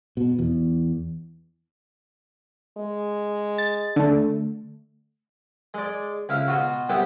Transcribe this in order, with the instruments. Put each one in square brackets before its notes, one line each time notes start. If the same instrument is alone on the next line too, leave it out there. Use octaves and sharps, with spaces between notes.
[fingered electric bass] B2
E2
[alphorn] G#3
[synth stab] A6
D3 A3
[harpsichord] G#3 D5
C#2 E4 F5
B2 F4 F#4
C2 B3 E4 G4